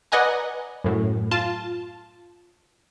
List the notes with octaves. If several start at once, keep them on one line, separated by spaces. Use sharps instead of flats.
B4 D5 D#5 F#5 G#5 A#5
F#2 A2
F4 A5